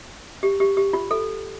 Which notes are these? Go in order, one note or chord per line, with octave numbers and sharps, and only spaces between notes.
G4
G4
G4
F4
A4